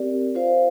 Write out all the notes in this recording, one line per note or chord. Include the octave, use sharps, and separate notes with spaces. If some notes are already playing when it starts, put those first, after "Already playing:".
Already playing: C4 G4 A#4 D5
F4 C5 F5